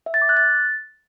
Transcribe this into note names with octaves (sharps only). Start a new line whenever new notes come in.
E5
A6
D6
F#6
A6